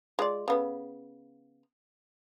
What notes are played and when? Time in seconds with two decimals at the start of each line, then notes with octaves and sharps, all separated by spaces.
0.19 G#3 F4 D5
0.48 C#3 B3 A4